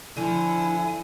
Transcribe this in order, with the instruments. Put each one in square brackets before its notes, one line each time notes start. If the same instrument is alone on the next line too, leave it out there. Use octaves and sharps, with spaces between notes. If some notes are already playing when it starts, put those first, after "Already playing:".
[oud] D3 F3 [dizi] E4 [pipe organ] G#5